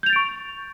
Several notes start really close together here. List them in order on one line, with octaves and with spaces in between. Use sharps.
G6 F7 A6 D7 C#6